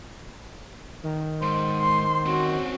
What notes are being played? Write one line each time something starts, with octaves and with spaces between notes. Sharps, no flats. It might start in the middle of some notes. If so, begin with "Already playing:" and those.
D#3
G#2 C5
C6
C4 C#4 F#4